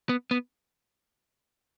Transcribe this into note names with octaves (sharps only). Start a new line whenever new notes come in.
B3
B3